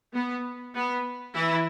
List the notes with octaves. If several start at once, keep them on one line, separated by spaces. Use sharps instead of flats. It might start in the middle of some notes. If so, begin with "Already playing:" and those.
B3
B3
E3 E4